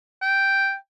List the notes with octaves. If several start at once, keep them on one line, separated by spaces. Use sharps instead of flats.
G5